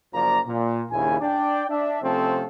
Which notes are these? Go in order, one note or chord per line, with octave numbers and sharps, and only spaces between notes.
F#1 F3 A#3 D5 A#5
A#2
A#1 D#2 C#3 E4 G#5
D4 D5 G5
D4 E5
C3 F3 A3 C4 C#4 A4